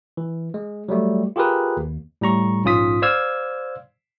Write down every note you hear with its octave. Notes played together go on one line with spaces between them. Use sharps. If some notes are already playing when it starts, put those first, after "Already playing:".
E3
G#3
F#3 G3 A3
F4 G4 G#4 A#4 B4
D#2
A2 G3 A#5 C#6
A#1 G#2 C#4 F4 D#6 B6
C5 D5 F5 E6 F6 G#6